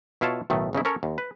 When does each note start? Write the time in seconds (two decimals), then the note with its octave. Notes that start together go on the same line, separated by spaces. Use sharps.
0.21 B2 E4 F4 C#5 A5
0.50 B1 A2 D#3 A3
0.73 G1 C#3 D#4 E4
0.85 C#4 A4 A#4 C#5
1.03 D#2
1.18 B4